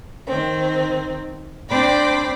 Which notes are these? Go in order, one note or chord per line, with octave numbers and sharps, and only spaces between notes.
D#3 C4
C4 D4 C5 D5 G5 B5